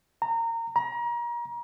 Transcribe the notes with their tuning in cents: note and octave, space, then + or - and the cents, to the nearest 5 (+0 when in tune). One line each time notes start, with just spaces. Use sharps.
A#5 -25
A#5 +30